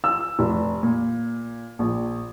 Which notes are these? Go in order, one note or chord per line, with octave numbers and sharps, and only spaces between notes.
E6
F1
A#2
A#1